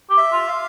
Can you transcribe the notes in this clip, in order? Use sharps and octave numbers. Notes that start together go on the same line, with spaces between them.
G4
E5
F4
F5